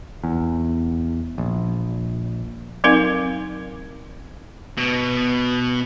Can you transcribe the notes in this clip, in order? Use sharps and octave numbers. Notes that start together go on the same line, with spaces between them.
E2
A#1
F#3 C4 D#4 A#4 F5
B2